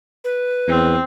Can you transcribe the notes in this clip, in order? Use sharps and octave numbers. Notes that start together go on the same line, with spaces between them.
B4
E2 C4